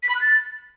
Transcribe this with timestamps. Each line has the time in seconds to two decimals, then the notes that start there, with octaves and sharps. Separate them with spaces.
0.03 B6
0.09 B5
0.15 F#6
0.21 A6